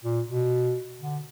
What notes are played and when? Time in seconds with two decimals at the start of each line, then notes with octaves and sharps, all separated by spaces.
0.04 A#2
0.28 B2
1.01 D3